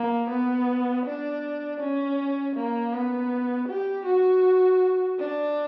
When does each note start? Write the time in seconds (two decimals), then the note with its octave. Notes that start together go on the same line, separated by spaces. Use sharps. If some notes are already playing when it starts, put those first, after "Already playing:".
Already playing: A#3
0.31 B3
1.06 D4
1.80 C#4
2.56 A#3
2.93 B3
3.68 G4
4.05 F#4
5.19 D4